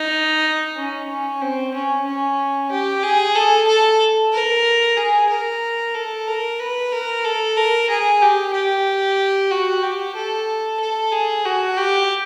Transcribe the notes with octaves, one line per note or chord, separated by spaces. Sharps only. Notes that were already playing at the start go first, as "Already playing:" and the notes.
Already playing: D#4
C#4
C#4
C4
C#4
C#4
G4
G#4
A4
A4
A#4
G#4
A#4
A4
A#4
B4
A#4
A4
A#4
G#4
G4
G4
F#4
G4
A4
A4
G#4
F#4
G4